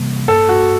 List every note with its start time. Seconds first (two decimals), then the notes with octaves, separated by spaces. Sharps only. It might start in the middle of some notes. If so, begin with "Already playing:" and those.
Already playing: C3 E3 G3 A#3
0.28 G2 A4
0.49 F#4